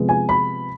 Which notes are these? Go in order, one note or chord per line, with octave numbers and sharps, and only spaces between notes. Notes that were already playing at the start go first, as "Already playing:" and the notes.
Already playing: C3 F3 G#3 B3
G#5
B5